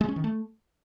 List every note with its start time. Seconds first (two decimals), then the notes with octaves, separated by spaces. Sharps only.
0.01 G#3
0.08 C#4
0.16 D#3
0.24 A3